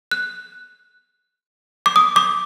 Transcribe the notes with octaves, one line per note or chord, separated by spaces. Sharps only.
F#6
D6
D#6
D6